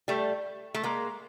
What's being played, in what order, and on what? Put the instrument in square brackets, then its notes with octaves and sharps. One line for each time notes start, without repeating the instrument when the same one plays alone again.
[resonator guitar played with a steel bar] G3 A3
A3
G#3 A#3